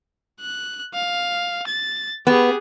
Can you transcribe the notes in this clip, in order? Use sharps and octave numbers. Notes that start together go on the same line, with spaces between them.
F#6
F5
A6
B3 G4 G#4